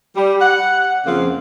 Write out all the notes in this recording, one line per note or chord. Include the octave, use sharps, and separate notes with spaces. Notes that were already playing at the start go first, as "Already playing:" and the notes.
G3
F#5
F2 C#3 F3 A#3 C4 F5